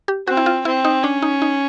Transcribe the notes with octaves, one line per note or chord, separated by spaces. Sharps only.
G4
C4 F#4
E4
F4
C4 E4
D#4
C#4 D4
D#4
D#4